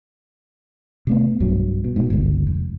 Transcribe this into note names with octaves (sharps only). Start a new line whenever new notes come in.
C3 A3 B3
B1 G2 F#3
B2
G#2 B2
G1 C#2
F1